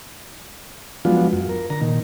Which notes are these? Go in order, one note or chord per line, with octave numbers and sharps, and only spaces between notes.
F3 F#3 G#3 B3 D4 F4
F#2
A#4
D3 A#5
A#2 D#3